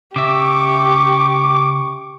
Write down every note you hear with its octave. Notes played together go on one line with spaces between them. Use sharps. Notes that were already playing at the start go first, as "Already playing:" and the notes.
C#3 G4 E5 C#6 D6